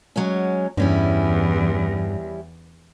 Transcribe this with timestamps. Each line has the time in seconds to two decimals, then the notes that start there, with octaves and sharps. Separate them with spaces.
0.16 F#3 G#3 C#4
0.77 E2 G2 G3 C#4 E4